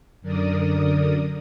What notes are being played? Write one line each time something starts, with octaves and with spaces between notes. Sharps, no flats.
F#2 D3 A#4 D5 D#6